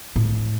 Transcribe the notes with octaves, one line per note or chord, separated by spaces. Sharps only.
A2